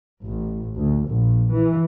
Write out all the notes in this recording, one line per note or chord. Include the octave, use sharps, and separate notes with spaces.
A1
D2
A#1
E3